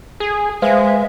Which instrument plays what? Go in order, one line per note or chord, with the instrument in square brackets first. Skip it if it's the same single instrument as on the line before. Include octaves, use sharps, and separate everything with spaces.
[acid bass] G#4
[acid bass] G#3 [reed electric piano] B4 C5 F5 [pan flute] E5